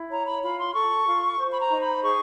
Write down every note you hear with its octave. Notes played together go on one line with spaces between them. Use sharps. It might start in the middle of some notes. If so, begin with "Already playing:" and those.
Already playing: E4
C#5 A#5
B5
F4 B5
C6
A4 C#6
F4
C5
B5
A#5
D#4
B5
G#4 C#6